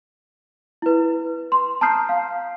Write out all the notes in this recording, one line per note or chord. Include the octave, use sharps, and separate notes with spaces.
E4 B4
C6
A5 A#5 D#6 F6 G6 C7
F5